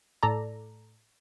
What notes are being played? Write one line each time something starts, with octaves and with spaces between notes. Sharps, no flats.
A2 A4 D5 A#5